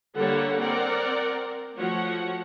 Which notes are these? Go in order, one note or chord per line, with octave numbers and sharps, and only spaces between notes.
D3 G3 A#3 A4 C#5 F#5
C4 A#4 D5 F#5
F3 A3 F#4 C#5 F#5